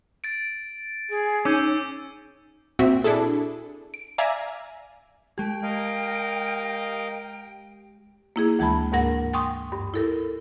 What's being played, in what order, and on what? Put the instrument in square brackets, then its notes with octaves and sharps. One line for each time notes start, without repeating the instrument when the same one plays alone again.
[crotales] A6 D7
[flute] G#4
[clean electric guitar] C#4 [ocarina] D#4 [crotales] D6 E6 G6
[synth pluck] A#2 C4 F#4 E5
D4 E4 G#4 A4
D7
D5 E5 F5 G#5 A#5
[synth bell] G#3 G4 [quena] G5
[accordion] A#4 D#5 F5
[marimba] A#3 E4 G#4
D2 E3 G#3 A5 B5
D2 G#2 A#3 A#4 F#5 A#6
G5 G#5 C6 C#6 D#6
G2
E4 A4 A#4